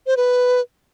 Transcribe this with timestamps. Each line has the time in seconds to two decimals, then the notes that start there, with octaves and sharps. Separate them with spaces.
0.07 C5
0.17 B4